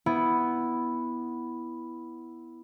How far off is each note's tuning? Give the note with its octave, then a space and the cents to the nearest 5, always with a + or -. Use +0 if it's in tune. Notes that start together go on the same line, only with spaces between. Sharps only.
B3 +0 E4 +0